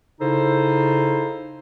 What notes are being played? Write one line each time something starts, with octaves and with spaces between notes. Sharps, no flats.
C#3 D#4 E4 A4 C5